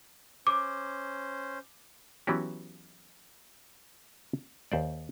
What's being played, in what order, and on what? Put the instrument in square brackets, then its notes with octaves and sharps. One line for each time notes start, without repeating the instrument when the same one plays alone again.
[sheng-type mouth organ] C#4 C5 [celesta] D6
[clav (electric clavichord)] E3 F#3 B3 C#4 F#4 G4
D#2 C5 D5